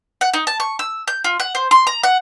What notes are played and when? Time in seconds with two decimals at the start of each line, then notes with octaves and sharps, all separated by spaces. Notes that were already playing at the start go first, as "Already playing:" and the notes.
0.21 F#5
0.34 D#4
0.47 A5
0.60 C#6
0.79 E6
1.08 G6
1.24 F4
1.40 F#5
1.55 C5
1.71 C6
1.87 A#5
2.03 F#5